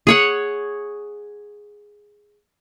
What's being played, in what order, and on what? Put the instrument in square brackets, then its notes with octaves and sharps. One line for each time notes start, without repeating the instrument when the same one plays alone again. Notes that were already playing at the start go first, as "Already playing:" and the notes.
[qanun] G#4 C#5 F#5